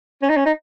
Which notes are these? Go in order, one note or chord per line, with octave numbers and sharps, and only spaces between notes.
C#4
D#4
C#4
D#4